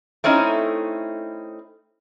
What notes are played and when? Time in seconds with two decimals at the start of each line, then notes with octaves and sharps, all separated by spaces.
0.24 A3 C4 C#4 D#4 E4